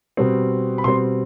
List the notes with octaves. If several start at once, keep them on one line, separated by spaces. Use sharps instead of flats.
B2 G3 C4
B5
B2 G3 C4 C6